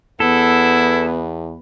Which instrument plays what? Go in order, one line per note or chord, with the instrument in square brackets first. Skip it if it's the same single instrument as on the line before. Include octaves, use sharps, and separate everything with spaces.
[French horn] E2 [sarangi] B3 [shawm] E4 [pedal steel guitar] A4